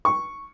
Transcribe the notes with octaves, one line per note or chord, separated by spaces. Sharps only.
C#6